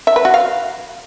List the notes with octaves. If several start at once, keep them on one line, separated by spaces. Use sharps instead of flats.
E5
B4
F#4
F5